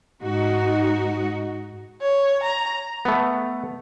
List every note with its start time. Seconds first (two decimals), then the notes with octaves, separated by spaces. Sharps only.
0.22 G#2 D#4 F#4
2.02 C#5
2.44 A#5
3.05 A3 B3